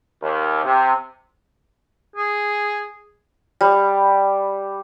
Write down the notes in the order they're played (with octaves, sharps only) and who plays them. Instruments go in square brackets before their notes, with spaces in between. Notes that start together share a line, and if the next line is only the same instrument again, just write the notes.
[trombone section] D#2
C3
[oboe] G#4
[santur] G3